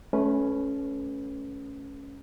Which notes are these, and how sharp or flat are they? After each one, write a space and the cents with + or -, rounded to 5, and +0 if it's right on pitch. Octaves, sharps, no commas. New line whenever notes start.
A3 -30 C#4 +0 B4 +0